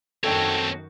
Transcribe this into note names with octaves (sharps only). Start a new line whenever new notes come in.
F#2 D#3 C4 F#4 A4 C#5 G5 A5